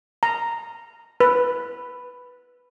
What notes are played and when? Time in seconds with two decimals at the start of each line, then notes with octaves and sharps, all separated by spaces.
0.23 A#5
1.20 B4